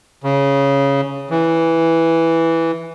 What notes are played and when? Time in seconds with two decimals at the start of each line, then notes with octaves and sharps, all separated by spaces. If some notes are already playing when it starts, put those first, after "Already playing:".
0.24 C#3
1.30 E3